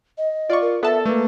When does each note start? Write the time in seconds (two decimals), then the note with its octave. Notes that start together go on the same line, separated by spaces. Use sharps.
0.18 D#5
0.50 F4 D5 C#6
0.61 A#4
0.83 B3 A4 E5 A5
1.05 A3 A#3 B4